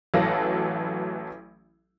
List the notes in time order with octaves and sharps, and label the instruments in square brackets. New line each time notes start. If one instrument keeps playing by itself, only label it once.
[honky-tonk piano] A1 E3 F#3 A4 F5 A#6